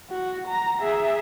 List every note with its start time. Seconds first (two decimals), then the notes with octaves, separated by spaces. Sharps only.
0.10 F#4
0.48 A#5
0.81 G#4 E5